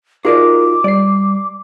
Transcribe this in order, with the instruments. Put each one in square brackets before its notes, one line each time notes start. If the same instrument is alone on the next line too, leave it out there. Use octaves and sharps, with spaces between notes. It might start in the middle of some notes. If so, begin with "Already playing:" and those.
[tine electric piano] D#4 F4 F#4 [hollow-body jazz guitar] G#4 A#4 D5 [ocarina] D6
[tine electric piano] G3 C7 [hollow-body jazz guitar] D5